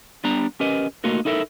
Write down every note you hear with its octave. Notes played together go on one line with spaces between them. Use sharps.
G3 B3 D4 D5 A#5
C#4 G4 A#4 B4 D#5
A3 A#3 D#4 F4 F#4 A#4
D#4 E4 A4 A#4 E5